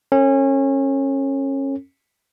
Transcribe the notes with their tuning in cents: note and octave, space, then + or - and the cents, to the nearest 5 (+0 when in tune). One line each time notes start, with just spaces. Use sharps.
C#4 -25 A4 +35